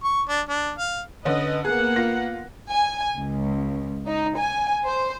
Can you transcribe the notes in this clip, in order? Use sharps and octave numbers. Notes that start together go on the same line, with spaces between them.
C#6
D4
D4
F5
D3 C#4 B4 D#5
A#3 B3 G#4 F#5
F4 A#6
G#5
C#2
D#4
G#5
C5